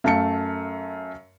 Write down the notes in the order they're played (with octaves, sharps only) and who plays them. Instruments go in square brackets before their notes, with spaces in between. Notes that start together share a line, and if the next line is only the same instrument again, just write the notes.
[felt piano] F#2 A3 F5 A5 C#7